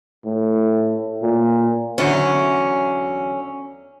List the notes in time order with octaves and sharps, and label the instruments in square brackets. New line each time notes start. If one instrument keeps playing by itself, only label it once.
[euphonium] A2
A#2
[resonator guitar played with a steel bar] E2 D3 F#3 [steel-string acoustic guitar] C#4